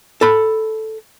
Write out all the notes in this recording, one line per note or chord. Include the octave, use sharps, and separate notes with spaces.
A4 B5